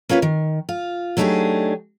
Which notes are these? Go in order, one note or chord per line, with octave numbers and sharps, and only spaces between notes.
A#3 C#4 F4 G4 B4
D#3
F4
F#3 A3 D4 D#4 G4 G#4